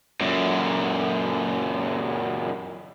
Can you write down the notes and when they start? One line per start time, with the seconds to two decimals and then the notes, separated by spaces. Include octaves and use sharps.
0.21 F#2 A#2